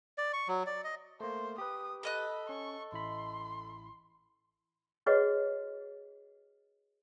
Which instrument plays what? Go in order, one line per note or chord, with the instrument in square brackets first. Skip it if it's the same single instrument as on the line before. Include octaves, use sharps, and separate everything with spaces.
[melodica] D5
C#6
F#3
D5
D#5
[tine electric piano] A3 A#3 [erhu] C5
[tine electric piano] G4 B4 [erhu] D#6
[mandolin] A4 D#5 F#6 [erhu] B5
[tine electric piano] C#4 [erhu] C#6
[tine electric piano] A1 E4 B5 [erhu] C6
[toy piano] F#4 G#4 B4 C#5 D#5 F#5